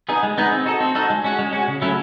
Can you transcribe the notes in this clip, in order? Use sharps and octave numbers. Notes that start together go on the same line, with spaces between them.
B3 D#4 G#4
G#3
B3 D#4 G#4
C4
D#4 F#4 A4
C4
D#4 F#4 A4
G#3
C#4 F#4
G#3
C#4 F#4
C#3
F#3 A3 C#4 E4